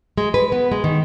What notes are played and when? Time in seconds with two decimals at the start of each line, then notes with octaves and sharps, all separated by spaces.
0.18 G#3
0.34 B4
0.52 B3
0.72 G#3
0.84 D#3